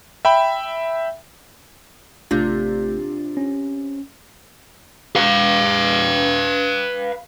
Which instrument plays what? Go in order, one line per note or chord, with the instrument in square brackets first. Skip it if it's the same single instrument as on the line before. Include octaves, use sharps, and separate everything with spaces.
[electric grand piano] E5 G5 B5
[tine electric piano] A1 A3 G6 [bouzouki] C3 [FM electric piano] D4 F4
[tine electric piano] C#4
[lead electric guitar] B4 F5